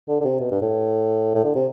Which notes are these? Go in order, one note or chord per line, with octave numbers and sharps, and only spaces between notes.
D3
D3
C3
B2
G2
A2
A2
D3
C3